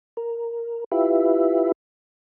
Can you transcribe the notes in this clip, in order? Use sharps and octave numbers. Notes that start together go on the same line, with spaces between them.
A#4
E4 F4 G4 B4 E5